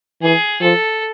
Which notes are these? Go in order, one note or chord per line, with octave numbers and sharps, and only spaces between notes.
E3 G#4
F3 A4